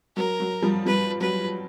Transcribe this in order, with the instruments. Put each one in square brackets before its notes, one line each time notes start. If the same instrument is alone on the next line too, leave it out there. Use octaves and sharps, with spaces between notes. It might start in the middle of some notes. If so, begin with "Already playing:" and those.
[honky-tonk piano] F#3 [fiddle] A#4
[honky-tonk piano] F#3
F3 G3
[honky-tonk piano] F3 G3 [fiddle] B4
[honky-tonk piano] F#3 [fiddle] B4